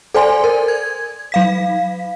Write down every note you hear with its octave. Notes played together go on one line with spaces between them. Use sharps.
A4 C5 D5 G#5 C6
A#4
G#6
F#3 F5 B6